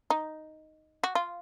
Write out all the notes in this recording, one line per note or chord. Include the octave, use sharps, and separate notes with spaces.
D#4
F#4
F4